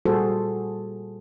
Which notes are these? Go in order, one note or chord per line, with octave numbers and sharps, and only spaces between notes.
A#2 G3 F#4 G#4 A4 C5